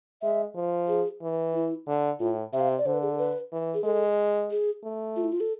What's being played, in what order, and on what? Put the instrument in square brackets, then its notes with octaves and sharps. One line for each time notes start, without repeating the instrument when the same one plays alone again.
[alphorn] G#3 [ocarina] E5
[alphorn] F3
[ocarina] G#4
[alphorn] E3
[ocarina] E4
[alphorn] D3
[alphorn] A2 [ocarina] F4
[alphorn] C3 [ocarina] E5
[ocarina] F5
E5
D5
[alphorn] D3 [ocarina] C5
[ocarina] B4
G#4
A4
B4
[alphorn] E3
[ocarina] G#4
[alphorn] G#3 [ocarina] A4
[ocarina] G#4
[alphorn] A3
[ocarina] F4
E4
F4
A4